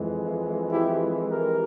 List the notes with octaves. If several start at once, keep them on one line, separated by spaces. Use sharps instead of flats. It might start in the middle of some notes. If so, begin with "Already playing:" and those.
Already playing: F2 E3 G#3
E4 G4
G4 A#4